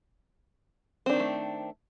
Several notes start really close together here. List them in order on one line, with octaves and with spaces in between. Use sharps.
C4 D4 D#3 G3 A3